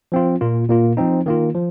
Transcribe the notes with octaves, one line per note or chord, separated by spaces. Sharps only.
F3 C4 F4
A#2 A#3 F4
A#2 A#3 F4
F3 C4 D#4
D#3 A#3 F4
F3